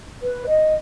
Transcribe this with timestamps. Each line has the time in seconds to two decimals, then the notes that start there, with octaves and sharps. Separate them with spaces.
0.23 B4
0.47 D#5